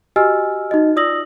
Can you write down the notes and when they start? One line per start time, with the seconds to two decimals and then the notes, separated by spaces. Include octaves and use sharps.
0.16 F#4 G4 D#5 G#5 E6 F6
0.71 D#4 F#4 D#5
0.96 F4 D5 D#6 E6 A#6 F#7